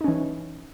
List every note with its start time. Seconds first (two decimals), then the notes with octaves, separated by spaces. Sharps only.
0.01 D#4
0.04 C#4
0.08 E3